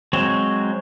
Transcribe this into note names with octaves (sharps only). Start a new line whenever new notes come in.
F#3 G#3 C4 C#5